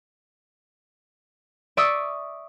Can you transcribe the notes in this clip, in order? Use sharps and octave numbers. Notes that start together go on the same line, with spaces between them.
D5 E5 C#6 D#6 E6